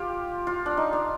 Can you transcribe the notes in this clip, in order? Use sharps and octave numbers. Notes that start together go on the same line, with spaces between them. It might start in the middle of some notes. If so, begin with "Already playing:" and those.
Already playing: F4 G4
F4
D4
D#4
D4